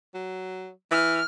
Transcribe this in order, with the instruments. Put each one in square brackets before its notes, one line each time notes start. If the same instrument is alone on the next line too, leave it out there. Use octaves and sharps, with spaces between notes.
[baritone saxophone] F#3
[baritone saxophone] E3 [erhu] F6